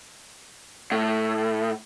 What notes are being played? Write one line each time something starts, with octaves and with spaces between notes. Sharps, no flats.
A2